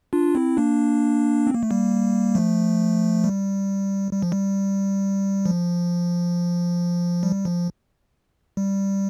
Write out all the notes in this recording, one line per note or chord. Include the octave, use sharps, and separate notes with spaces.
D4 F4
C4 E4
A#3 D4
C4
A#3
A3
G3 A#3
F3 A3
G3
G3
F3
G3
F3
G3
F3
G3